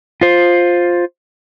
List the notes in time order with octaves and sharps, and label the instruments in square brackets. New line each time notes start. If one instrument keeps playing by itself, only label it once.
[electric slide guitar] F4 C5